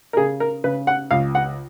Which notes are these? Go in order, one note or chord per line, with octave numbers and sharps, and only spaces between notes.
A#4
C#3 G#4
A#4
C#3 B4
F#5
C#2 F5
F#5